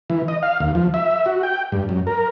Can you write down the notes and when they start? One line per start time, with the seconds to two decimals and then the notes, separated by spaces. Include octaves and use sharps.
0.10 E3
0.28 D#5
0.43 F5
0.60 D#2
0.75 F3
0.94 E5
1.26 F#4
1.43 G5
1.72 G2
1.89 F#2
2.07 A#4